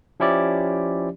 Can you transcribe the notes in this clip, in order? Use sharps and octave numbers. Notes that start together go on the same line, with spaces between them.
F3 C#4 E4 G4 D5